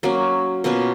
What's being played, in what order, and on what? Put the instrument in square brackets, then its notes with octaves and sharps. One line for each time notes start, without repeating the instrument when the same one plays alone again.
[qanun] F#3 A#3 C#4
B2 A#3 C#4 F4